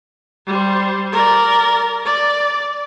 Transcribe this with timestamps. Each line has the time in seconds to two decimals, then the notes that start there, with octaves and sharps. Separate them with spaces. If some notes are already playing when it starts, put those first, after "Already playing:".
0.47 G3 C5
1.12 A#4 D5
2.05 D5